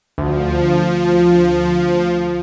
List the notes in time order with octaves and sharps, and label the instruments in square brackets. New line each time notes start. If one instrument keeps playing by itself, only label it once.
[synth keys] D2 [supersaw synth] F3